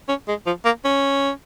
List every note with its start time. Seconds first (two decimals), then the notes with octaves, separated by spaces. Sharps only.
0.09 C#4
0.28 G#3
0.47 F3
0.65 A#3
0.85 C#4